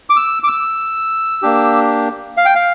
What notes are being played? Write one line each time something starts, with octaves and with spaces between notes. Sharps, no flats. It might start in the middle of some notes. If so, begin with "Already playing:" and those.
D6
E6
D6
E6
A#3 D4 G4
F5
G5
F5